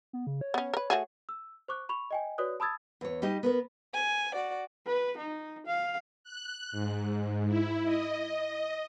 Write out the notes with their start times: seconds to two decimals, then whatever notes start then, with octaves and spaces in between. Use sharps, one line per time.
0.13 B3
0.27 C#3
0.41 C#5
0.54 B3 C#4
0.74 A#4 B4
0.90 A3 F#4 G#4
1.29 E6
1.68 C5 C#6 D6 F#6
1.89 B5 C#6 F7
2.11 D#5 G5 G#5
2.38 F#4 B4 C#5 D5 D#6 F#6
2.60 A5 B5 D#6 E6 G#6 A6
3.01 E2 C#5
3.22 G3 D#4 G4 D#5
3.43 B3 A#4 B4
3.93 G#5
4.34 F#4 D5
4.86 B4
5.17 D#4
5.66 F5
6.24 F#6
6.72 G#2
7.48 E4
7.85 D#5